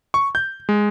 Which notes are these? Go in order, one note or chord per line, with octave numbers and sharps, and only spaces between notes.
C#6
G6
G#3